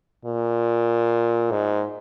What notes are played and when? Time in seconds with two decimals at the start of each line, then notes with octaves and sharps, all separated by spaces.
0.25 A#2
1.51 G#2